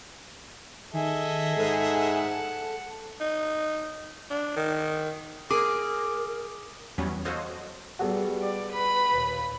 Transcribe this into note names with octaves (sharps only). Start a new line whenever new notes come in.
D#3 G#4 A4 D#5 E5
G#2 A4 F#5 A5
D#4
D4
D#3
G#4 A#4 D6
E2 F#3 G3 B3 C#4
F#4 A4 C5 C#5 D#5 F5
G3 B3 F#4 G#4 A4
D5
B4 B5
D#2 A#2